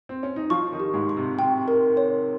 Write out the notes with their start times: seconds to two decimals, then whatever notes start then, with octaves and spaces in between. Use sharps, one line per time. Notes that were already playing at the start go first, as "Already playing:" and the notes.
0.09 C4
0.23 C#4
0.36 D#4
0.50 F3 F4 C#6
0.72 D#3 D#4
0.80 G4
0.94 G#2 G#3
1.09 C#6
1.17 C3
1.39 C3 G5
1.68 A#4
1.97 C#5